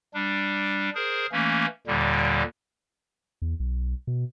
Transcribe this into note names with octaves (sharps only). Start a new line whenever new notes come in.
G3 D4
G#4 A#4 C5
E3 A3 A#3 C#4
D#2 A#2 D3 G3
E2
B1
B2